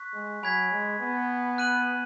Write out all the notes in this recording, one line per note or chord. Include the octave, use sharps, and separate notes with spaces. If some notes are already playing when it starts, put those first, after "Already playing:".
Already playing: C#6 F#6 B6
G#3
F#3 G#5 B5 G#6 B6
G#3
B3
F#6 D#7 F#7